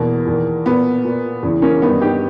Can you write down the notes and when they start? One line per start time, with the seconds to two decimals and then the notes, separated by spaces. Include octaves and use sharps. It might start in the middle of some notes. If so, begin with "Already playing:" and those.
Already playing: E2 B2 A#3
0.27 E2 D#3
0.66 A#2 B3
1.04 A#2
1.43 E2 C#3 E3
1.62 A#3 C#4
1.82 G2 D#3 B3 D#4
2.01 D#4 G4